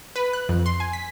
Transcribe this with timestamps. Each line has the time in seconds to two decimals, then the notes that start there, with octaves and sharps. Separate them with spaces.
0.16 B4
0.33 F#6
0.49 F2
0.66 C6
0.80 G#5
0.93 B6